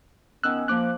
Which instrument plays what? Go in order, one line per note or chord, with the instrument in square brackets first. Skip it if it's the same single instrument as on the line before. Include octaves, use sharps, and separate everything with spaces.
[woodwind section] D#3 B3 C#4 [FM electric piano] E6 F#6
[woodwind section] F3 A#3 [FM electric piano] D6 F#6